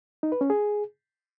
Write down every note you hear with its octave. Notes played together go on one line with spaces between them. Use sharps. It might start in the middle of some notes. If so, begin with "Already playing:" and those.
D#4
B4
C#4
G#4